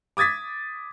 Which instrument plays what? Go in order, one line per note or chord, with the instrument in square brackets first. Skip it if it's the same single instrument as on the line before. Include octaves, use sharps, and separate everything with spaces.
[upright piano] D6 D#6 G#6 A6 B6